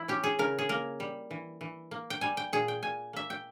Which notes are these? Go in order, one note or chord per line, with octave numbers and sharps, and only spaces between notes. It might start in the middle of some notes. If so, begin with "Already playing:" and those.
Already playing: E3 E4
C#4 G4
G#4
C#3 A#4
G#4
A#3 A#4
G3
E3
E3
A#3
G5
G3 G#5
G5
A#2 G#4
G5
A#2 G#5
A#3 E5
G5